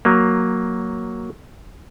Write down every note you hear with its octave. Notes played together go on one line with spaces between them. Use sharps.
F#3 A#3